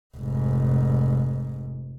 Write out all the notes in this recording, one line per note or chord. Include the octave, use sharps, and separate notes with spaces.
F1 G#2